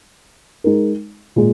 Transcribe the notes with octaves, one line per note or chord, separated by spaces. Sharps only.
G#3 D#4 A#4
A#2 G#3